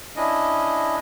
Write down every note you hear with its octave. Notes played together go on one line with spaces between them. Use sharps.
C#4 D4 E4 D#5